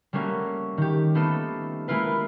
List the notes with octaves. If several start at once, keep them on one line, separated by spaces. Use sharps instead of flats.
G3 A3 A#3 C#4 F#4
D#3 G4
A3 B3 D#4 F4 A4
G#3 A#3 E4 F4 B4